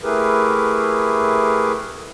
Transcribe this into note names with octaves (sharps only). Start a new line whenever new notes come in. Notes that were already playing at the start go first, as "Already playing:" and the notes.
A3 E4 G4 G#4 A#4 B4